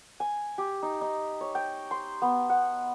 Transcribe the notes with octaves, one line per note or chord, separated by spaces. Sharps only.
G#5
G4
D#4
D#4
C#5
G5
C6
B3
F#5